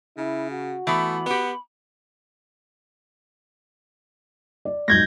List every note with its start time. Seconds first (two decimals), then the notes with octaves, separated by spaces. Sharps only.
0.18 C#3 E4
0.51 F#4
0.87 E3 A3 B3 B5
1.26 B3 G4 F#5
4.65 D5
4.88 B1 G#2 G6 G#6 A#6